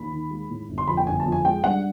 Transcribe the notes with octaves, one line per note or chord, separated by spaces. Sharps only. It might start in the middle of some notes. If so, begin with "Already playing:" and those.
Already playing: D#2 B5
D#3
G#3
A2
G1
C6
F2 B5
G5
G1 G#5
A5
F2
G#5
G#3 G5
G2 F#5